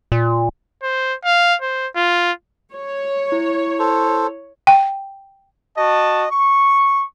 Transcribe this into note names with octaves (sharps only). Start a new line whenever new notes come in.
A#2
C5
F5
C5
F4
C#5
E4
A4 C5
G5
F#4 D#5 A5
C#6